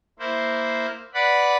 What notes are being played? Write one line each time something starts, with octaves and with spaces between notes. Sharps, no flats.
A#3 E4 C5
B4 D5 F#5 B5